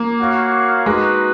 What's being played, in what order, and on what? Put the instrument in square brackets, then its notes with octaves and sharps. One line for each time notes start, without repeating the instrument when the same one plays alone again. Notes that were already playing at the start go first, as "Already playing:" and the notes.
Already playing: [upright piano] A#3
[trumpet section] F#4 C#5 F5
[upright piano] G#3 [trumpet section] D#4 F#4 B4